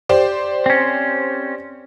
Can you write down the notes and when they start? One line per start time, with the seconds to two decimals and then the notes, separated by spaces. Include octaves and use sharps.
0.09 G4 C5 D5
0.66 C4 C#4